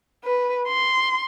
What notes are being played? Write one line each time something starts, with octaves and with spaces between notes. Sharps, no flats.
B4
C6